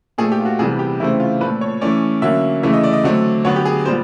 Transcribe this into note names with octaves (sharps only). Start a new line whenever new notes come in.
A#2 F3 A3 G#4
G4
F4
F#4
C3 E3 G3 B3 G#4
G4
C#3 E3 A3 C4 E4
F4
A#2 F3 A3 B4
C#5
E3 A3 C#4 D5
D3 F#3 A#3 C#4 E5
C#3 E3 A3 E5
D#5
D5
D#5
D3 F#3 A3 C4 D5
D3 F#3 B3 C#5
G4
G#4
A#2 G3 B3 C5